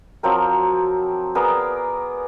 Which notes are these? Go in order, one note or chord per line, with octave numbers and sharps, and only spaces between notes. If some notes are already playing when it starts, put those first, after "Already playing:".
F3 F#3 C4 A#4
B3 G#4 A#4 D5